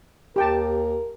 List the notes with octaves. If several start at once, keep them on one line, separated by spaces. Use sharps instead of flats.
D#2 G4 A#4 G5 A5